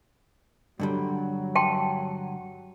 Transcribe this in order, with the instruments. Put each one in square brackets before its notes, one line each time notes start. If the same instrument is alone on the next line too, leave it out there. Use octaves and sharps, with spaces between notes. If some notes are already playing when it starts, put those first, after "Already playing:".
[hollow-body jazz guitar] G2 D3 G3 [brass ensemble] F#3
[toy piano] G5 A5 C6